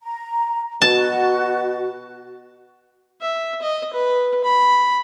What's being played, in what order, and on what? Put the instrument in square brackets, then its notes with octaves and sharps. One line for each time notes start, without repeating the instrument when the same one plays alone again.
[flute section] A#5
[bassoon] B2 [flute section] F#4 [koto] A5
[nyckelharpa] E5
D#5
B4
B5